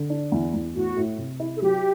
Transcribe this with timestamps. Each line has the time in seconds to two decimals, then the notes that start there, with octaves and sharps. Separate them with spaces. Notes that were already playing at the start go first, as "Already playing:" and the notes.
Already playing: D3
0.10 D4
0.32 E2
0.54 E2
0.75 A2 F#4
0.96 A2
1.18 C3
1.40 E4
1.56 A4
1.62 F#3 G4